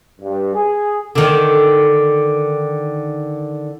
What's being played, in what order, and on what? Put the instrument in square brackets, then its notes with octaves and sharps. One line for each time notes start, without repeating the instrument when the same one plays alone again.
[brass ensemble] G2
G#4
[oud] D3 D#3